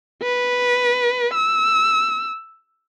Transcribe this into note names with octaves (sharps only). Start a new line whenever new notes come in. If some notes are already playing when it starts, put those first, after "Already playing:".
B4
E6